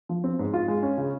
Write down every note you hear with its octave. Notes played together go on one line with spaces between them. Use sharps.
F3
C4
G#2
F4
G#3
C#4
C#3